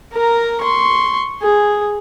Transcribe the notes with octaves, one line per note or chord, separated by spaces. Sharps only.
A#4 A#5
C6 C#6
G#4